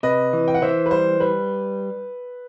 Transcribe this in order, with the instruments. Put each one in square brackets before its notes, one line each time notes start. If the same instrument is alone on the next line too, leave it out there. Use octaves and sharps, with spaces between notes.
[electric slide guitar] C3 [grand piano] B4 D#5
[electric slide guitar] E3
[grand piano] G5
F#5
[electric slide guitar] E3 [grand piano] C5 E5
[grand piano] B4
[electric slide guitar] G3 [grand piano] C5
[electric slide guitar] G3 [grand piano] B4